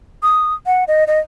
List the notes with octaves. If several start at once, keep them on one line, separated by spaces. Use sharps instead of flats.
D#6
F#5
D#5
D#5